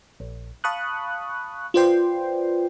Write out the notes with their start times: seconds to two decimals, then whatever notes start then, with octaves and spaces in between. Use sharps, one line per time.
0.20 A#1
0.64 F5 A5 B5 C#6 D#6 F#6
1.74 F4 B4 C5 D5 G5 C6